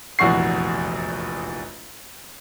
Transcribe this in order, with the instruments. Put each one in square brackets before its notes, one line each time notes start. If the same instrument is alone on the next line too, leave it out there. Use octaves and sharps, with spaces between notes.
[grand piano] F1 A#1 E2 F#4 C#6 C7